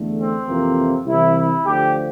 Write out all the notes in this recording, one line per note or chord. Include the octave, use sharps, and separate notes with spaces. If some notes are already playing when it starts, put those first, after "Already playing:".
Already playing: E2 D3 A3
C4
F2 C3 E3 A#3
C2 C3 E3 E4
E4
D2 D3 F3 G4